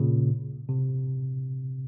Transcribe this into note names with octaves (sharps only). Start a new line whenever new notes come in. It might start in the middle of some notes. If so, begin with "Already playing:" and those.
Already playing: A#2 C#3
C3